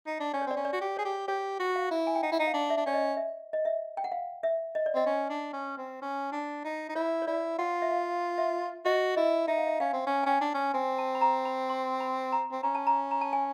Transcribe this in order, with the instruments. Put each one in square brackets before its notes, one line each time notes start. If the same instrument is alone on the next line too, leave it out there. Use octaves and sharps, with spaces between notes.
[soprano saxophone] D#4
D4
[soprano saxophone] C#4 [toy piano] D5
[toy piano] C#5
[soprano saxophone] C4 [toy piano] D5
[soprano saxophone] C#4
[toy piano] D5
[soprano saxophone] F#4
G4
[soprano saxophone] G#4 [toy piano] C#5
[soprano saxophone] G4
[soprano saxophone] G4 [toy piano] C#5
[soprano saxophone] F#4
[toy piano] F5
[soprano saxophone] E4
[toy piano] G#5
G5
[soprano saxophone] D#4 [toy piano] F#5
[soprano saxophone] E4
D#4
[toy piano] F5
[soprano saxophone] D4
[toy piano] E5
[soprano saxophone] D4
[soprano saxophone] C#4 [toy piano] D5
[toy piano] D#5
E5
D#5
E5
G5
F#5
F5
E5
D#5
D5
[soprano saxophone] C4 [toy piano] D#5
[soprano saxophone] C#4
D4
C#4
C4
C#4
D4
D#4
D#4
[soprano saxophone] E4 [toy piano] C#5
[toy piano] C#5
[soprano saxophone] E4 [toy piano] D5
[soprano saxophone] F4 [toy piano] F#5
[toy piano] E5
F5
E5
[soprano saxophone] F#4 [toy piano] D#5
[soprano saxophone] E4 [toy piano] D#5
[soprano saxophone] D#4 [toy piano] E5
[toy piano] F5
E5
[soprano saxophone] C#4 [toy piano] F5
[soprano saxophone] C4
C#4
[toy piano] G#5
[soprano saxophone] C#4 [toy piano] G5
[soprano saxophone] D4
C#4
[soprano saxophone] C4 [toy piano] G#5
[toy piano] A5
B5
A#5
B5
C6
B5
A#5
[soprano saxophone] C4
[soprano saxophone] C#4 [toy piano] A#5
[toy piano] A5
A#5
A#5
A5
G#5